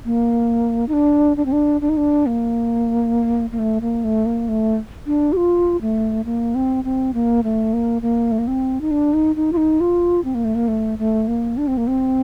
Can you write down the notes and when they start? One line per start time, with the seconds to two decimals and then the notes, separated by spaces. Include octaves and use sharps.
0.05 A#3
0.89 D#4
0.93 D4
1.37 D4
1.46 C4
1.52 D4
1.81 D4
1.89 D#4
1.97 D4
2.26 A#3
3.52 A#3
3.59 A3
3.81 A#3
4.04 A3
4.26 A#3
4.48 A3
5.06 D4
5.33 G4
5.37 F4
5.81 A3
6.25 A#3
6.55 C4
6.84 C4
7.14 A#3
7.44 A3
7.74 A#3
8.02 A#3
8.32 A3
8.39 A#3
8.47 C4
8.81 D#4
8.91 D4
9.14 D#4
9.36 D#4
9.53 F4
9.57 D#4
9.80 F4
10.25 C4
10.35 A#3
10.45 A3
10.55 A#3
10.68 A3
10.99 A3
11.28 A#3
11.57 D4
11.67 C4
11.77 A#3
11.87 C4